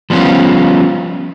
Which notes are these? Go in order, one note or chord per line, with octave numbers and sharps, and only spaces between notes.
F3 G3 B3 C#4 F4